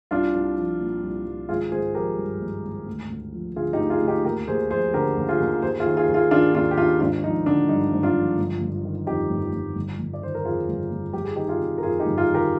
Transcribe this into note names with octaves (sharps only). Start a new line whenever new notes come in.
C2 D4 F4
C2
F3
A#2
C2
C2
G#1 F4 G#4
G#1 G#4 C5
F3 G4 A#4
G2
G#1
G#1
D2
D2
F3
D3 F4 G#4
D#4 G4
D2
F4 G#4
D2
D#4 G4
D#2 G4 A#4
D#2 G#4 C5
F3 G#4 C5
D3 G4 A#4
D#2
F4 G#4
D#2
D#2 G#4 C5
F4 G#4
D#3
F4 G#4
D#2
F4 G#4
D#3 D4 F4
D#2 D4 F4
G4
D#3 D4 F4
G#1 D4 F4
F3 D#4
D3 D4
G2 D#4
G#1
D4 F4
F3
G1
G1
D#3
F2 D#4 G4
G1
G1
G1
G1
D5
D#3 C5
A#4
F2 F4 G#4
G1
G1
G1 G4
G#4
D#3 D#4 G4
F4 G#4
C3
A#4
F2 F4 G#4
D#4 G4
G1
F4 G#4
D#3
G4 A#4